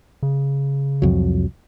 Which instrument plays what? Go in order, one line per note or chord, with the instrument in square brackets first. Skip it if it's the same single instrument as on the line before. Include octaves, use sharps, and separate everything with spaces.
[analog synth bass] C#3
[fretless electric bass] C2 F2 F#3